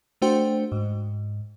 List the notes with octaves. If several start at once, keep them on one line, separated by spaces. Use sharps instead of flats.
A3 D4 F#4 C5 G5
G#2